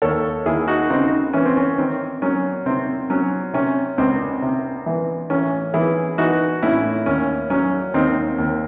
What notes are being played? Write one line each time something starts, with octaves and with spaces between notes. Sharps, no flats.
D#2 A4 C#5
D#2 E4 G#4
D#4 F#4
C#3 C4 D#4
E3 C#4
C4
C#4
D#3 C4
F#3 C#4
C3 C4
F#3 C#4
C3 C#4
C#2 C4
C3
E3
A1 C#4
E3 E4 G#4
E3 D#4 F#4
A2 C#4 E4
D#2 C#4
F#3 C#4
D#2 C4 D#4
D#2